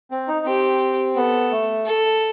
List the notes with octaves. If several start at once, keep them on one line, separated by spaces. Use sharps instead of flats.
C4
D#4
C4 G4
B3 A4
A3
A4